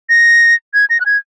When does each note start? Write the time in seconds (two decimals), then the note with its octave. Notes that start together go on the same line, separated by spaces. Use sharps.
0.09 A#6
0.74 G#6
0.90 A#6
1.00 F#6
1.06 G#6